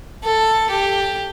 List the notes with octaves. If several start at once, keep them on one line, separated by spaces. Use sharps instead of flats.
A4
G4